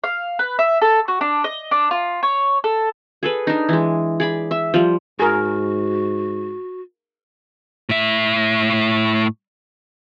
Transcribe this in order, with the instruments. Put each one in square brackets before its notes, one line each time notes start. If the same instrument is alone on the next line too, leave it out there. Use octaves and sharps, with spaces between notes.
[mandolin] F5
B4
E5
A4
F#4
D4
D#5
D4
F4
C#5
A4
[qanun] G#4 A4 B4
D4 D#4
E3 G#3
G#4 D5 B5
E5
F3 G3
[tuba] G#2 [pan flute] F#4 [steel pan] G#4 A#4
[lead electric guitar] A2 E5